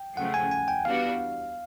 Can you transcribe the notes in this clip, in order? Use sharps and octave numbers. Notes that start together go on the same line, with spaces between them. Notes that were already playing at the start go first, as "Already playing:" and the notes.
Already playing: G5
C#3 F3 A3 F#5
G#5
G#5
G5
E3 G3 B3 D4 F#4 F5